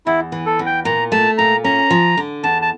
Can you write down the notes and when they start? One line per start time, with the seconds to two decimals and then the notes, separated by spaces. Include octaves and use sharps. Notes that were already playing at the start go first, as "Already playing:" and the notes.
0.06 E2 E4
0.32 E3
0.46 A4
0.59 E2
0.66 G5
0.85 A#2 A#5
1.12 A3 A5
1.38 A#2 A#5
1.64 C#4 A#5
1.90 F3
2.17 D3
2.44 E2 A5
2.62 A5